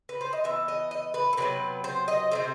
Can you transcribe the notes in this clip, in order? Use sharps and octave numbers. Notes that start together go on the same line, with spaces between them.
B4
C5
D#5
E3 B3 E5
D#5
D#5
B4
A4
C3 F#3 B3 B4
C5
D#5
C3 D#3 A3 C5